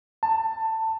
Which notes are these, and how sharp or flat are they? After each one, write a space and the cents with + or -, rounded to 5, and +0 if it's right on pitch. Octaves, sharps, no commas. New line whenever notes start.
A5 +20